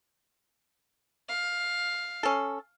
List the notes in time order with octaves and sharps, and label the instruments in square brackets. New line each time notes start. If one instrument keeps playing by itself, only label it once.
[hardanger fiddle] F5
[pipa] C#4 A4